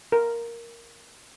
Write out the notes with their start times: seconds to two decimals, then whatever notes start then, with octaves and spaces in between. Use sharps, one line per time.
0.12 A#4